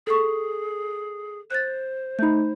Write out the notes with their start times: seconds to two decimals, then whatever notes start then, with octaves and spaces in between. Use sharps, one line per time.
0.07 G#4 A4 C#6
1.51 C5 F#6 A6
2.19 A3 D#4 B5 G6